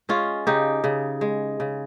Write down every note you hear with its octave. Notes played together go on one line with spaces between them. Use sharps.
G#3 C#4 F4
C#3 D#4 G4
C#3
G#3
C#3